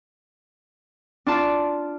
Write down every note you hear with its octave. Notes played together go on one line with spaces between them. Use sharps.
D4 F4 A5